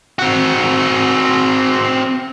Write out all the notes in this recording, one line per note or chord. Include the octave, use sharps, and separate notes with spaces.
C4 F#4